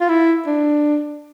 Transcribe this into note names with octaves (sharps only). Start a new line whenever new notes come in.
F4
E4
D4